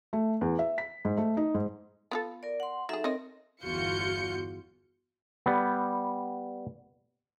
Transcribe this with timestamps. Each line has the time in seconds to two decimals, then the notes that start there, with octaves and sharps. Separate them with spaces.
0.13 A3
0.41 E2
0.59 E5
0.78 B6
1.05 G#2
1.17 A3
1.37 D#4
1.54 G#2
2.11 B3 F4 A4
2.43 A#4 D5
2.60 F#5 C6
2.89 F#3 D#4 G#4 A4 E5
3.04 C4 A#4 C#5 D#5
3.64 G1 E2 F4 F#4 G6 C#7
5.46 G3 B3